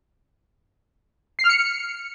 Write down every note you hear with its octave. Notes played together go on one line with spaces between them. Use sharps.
C7
F6
C#7